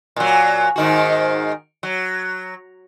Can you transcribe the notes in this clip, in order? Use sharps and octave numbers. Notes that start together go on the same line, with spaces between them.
A#2 F#3
G#2 D#3 F#4
F#3